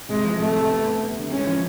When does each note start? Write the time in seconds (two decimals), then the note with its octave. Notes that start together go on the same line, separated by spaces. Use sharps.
0.09 C3 G#3
0.24 F3
0.39 C3 A3
0.55 C3
0.70 B3
0.86 B3
1.01 B3
1.17 D3
1.32 G#3 C#4
1.47 F3